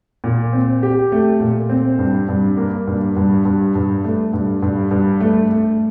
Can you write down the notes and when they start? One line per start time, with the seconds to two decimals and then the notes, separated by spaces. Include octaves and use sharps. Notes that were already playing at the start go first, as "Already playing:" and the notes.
0.24 A#2
0.53 C4
0.83 G4
1.12 A3
1.40 A#2
1.69 C4
1.99 G2
2.29 G2
2.57 A#3
2.87 G2
3.17 G2
3.45 G2
3.75 G2
4.04 A3
4.33 G2
4.62 G2
4.91 G2
5.20 A3
5.50 A3